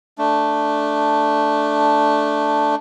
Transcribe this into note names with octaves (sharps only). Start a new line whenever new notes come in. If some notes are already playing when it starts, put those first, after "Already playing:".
A3 D4